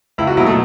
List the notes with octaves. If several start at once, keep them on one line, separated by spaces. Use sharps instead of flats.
C#2 E4
F#4
B2 F#3 E4
A3